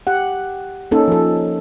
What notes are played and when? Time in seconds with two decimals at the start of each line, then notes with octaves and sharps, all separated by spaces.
0.07 G4 F#5
0.91 A#3 C#4 D#4 A4
1.08 F3 A4